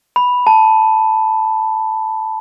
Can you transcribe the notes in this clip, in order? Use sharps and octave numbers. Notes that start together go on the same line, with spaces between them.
B5
A5